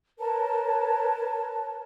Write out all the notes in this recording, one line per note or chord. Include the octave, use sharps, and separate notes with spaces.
A#4 B4 C#5 A5